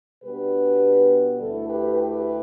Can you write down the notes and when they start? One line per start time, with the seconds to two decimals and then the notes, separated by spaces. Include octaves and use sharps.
0.24 B2 G3 B3 D4 G4 B4
1.40 D2 D3 A3 E4 A4
1.68 G4 B4
1.96 G4 B4